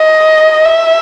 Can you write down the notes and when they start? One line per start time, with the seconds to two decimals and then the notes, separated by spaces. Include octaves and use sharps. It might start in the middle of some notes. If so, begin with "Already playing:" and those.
Already playing: D#5
0.65 E5